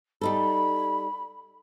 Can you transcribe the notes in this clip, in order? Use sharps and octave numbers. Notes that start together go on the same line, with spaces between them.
G3 D#4 A4 B5